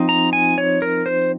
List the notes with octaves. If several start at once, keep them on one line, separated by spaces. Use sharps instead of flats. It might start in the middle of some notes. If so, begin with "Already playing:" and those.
Already playing: F3 C4 D#4
A#5
G#5
C#5
A#4
C5